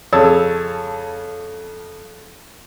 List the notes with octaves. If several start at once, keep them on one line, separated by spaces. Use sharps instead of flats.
F2 C#3 C#5 A5 E6